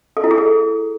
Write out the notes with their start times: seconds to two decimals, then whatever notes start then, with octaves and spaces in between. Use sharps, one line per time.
0.17 A4
0.24 E4
0.31 G#4
0.38 A4